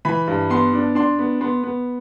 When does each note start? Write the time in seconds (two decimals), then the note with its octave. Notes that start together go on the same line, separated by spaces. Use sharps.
0.05 E3 B5
0.27 G2
0.50 B3 C6
0.73 D4
0.95 D4 C6
1.19 B3
1.41 B3 C6
1.63 B3